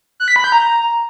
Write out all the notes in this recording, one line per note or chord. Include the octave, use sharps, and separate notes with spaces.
F#6
B6
B5
G6
A#5